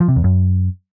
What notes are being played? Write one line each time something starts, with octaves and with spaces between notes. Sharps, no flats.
F3
C3
E2
F#2